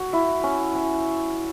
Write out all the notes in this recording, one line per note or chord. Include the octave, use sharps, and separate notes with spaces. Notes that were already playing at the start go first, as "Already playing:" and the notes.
Already playing: F#4
E4
C#4
C#4